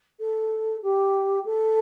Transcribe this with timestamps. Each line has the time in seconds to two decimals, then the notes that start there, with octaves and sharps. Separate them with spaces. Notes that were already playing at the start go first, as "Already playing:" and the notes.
0.20 A4
0.83 G4
1.45 A4